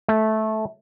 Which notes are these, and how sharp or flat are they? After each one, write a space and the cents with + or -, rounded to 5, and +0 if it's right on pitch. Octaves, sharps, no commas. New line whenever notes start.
A3 -10